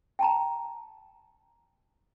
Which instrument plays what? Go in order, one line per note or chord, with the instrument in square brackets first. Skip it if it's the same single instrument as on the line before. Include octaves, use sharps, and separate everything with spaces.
[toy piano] G5 A5 A#5